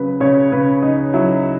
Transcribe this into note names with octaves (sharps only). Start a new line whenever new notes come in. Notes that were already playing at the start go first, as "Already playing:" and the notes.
Already playing: C#3 F#3 B4
C#3 C#5
C#3 B4
C#3 D#4
F#3 E4